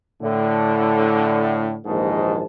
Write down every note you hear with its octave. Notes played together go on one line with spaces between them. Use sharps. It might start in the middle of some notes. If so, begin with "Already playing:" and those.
A2 D3
A#1 D#2 G#2 E3 D#5 A5